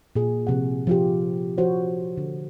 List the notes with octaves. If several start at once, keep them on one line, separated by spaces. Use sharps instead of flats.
A#2 G#4
C3 F3 F#5
F3 F4 G4
F3 F#4 C5 C#5
D3